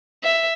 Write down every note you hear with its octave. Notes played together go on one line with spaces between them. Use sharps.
E5